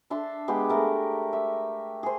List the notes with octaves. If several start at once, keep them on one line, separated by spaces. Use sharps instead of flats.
D4 E5 A5 C6
G#3 B3 G4 G#4
A3 A#4
E5
G#4 C5